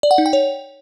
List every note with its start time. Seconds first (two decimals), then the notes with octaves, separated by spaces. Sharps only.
0.03 D5
0.11 F#5
0.18 D#4
0.26 G5
0.33 C#5